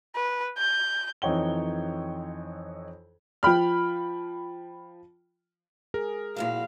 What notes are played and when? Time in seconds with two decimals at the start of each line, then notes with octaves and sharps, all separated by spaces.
0.15 B4
0.58 G6
1.22 F2 E3 D#4 C#5 G5 G7
3.43 F3 G5 B5 F6
5.94 G#4 A#4
6.36 A#2 E4 F#4 F5